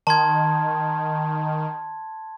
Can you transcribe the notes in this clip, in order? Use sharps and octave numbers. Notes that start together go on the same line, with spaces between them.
D#3 A5 C6 G#6